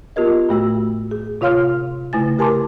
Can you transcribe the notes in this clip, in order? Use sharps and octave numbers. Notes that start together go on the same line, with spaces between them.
B3 F4 G4 A#4 D#5
A2 A3 F#4 E6
G#4
C3 F4 C#5 F5 C6 F6
C#3 A3 E4 G#5 A6
G4 A#4 G#5 A5 C6 D6